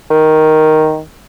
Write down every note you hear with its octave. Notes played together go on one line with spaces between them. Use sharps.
D#3